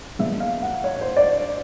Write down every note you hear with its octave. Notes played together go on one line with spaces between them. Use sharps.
A#2 F3 G#3 B3 E5
F5
F#5
C#5
C5
D5